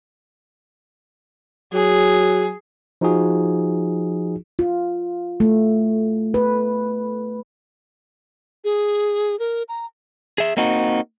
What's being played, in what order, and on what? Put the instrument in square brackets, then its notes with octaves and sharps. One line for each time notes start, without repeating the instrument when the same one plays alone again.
[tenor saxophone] F#3 [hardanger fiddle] G#4
[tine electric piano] F3 D#4 F4 F#4 G#4
[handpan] F4
A3
B4
[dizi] G#4
A#4
A#5
[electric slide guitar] G#4 E5
A#3 C4 D#4 F#4